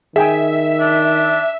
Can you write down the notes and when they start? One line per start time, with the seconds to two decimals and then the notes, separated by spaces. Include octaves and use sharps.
0.16 D#3 G#4 E5 G5 G#5
0.80 D4